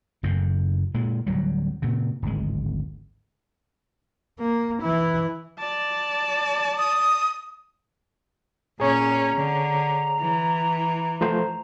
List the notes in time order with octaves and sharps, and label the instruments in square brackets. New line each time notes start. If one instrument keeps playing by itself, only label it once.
[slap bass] F#1 F#2 A2
A#2 G#3
D1 F#3 G3
A#2 C#3
D1 G#1 G#3
[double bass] A#3
E3 E4
[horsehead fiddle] D5 A5
[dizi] D#6
[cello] A#2 C#4 [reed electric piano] G#4 C#5 [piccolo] A#5
[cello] D3
E3
[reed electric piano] F3 A3 C5